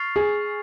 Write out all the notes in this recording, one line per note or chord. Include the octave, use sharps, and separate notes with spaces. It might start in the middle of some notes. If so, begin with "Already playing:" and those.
Already playing: C#6 F6 A6 C7 F7
G#4